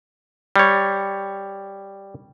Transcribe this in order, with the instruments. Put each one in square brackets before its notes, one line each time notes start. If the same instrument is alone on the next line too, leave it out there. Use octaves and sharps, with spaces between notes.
[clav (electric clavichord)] G3 C#5